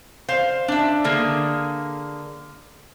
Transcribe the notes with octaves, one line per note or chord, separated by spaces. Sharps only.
C5 F5
D4 E5
D3 A#3 G#4